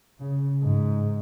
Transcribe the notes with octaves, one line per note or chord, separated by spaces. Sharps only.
C#3
G#2